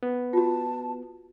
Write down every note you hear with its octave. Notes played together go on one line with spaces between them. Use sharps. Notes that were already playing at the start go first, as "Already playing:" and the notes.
B3
F4 F#4 A5